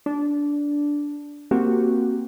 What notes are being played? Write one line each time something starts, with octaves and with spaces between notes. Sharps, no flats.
D4
A#3 C4 F#4 G4